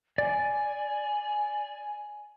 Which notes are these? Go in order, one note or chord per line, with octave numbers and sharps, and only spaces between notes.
D5 G#5